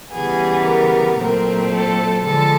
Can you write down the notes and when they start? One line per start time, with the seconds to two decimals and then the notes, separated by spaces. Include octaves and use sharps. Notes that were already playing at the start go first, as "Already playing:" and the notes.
0.14 C#3 E3 G3 B3 G#4
0.67 A#4
1.20 A#2 F#3 A3 C4 A#4
1.73 A4
2.25 D3 F3 G#3 A4